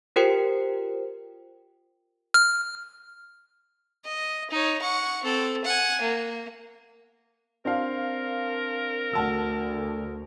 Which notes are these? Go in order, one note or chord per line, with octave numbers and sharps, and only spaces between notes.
F4 G4 A#4 C5 G5 C#7
F6
D#5
D#4 C#5
F#5 C#6
C4 A4
F#5 G#5
A#3
C4 D4 A#4 F5
D2 F#5 A5 E6